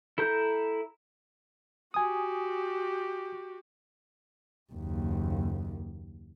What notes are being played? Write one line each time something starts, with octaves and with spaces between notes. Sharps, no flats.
E4 A4 A#5 G6
F#4 G4 G#5 D#6
F#1 D#2